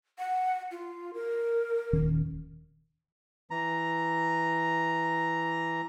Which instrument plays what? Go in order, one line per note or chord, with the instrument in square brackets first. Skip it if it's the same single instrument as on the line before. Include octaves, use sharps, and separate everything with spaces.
[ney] F#5
F4
A#4
[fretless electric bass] D#1 D#3 C#4
[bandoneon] E3 A#5